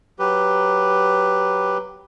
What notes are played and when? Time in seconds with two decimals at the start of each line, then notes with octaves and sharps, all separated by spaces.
0.19 F#3 G4 B4